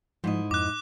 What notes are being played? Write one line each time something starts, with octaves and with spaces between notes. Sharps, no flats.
G#2 F3 E4 D#5
F2 D6 F#6